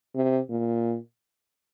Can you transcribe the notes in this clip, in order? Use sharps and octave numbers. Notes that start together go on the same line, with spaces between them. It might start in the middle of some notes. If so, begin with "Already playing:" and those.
C3
A#2